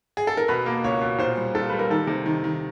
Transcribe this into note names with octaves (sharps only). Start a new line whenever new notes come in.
G#4
A4
A#4
B2 B4
A#3
C#2 C#5
B2
A#2 C5
G3
A#2 A4
G3 B4
A#4
D#3 A4
C3
D#3
D#3